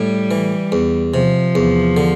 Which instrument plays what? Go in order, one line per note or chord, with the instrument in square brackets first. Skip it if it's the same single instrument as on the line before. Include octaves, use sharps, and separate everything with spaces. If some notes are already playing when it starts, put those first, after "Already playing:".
Already playing: [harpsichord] A2 [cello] G3
[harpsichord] E3
E2
[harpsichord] C3 [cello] F3
[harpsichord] E2
D3